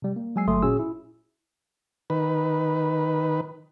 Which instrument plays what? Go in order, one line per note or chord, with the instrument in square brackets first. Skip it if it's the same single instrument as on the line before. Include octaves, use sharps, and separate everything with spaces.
[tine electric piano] C3 G3
A#3
F#3 G#3 G#5 E6 C7
G1 F#3 A3 C6 D#6
A#2 C#4 F#4 G#4 E6
E4
[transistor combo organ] D#3 B4